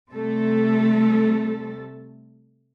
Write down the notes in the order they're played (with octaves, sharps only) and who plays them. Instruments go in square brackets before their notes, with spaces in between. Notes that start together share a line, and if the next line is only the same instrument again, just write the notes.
[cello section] C3 G3 A3 A4